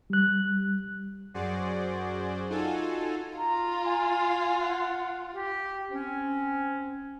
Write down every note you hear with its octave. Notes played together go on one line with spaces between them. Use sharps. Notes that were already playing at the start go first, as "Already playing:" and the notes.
G3 F#6
F#2 F#4 G#4 C5 D5
D#4 F4 F#4 A4 G#5 A5
F4 A#5
G#5
F#5
G4
C4 C#4